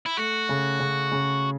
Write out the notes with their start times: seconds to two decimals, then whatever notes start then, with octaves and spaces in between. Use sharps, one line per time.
0.06 E4
0.17 A3 F#4
0.49 C#3
0.80 C#3
1.11 C#3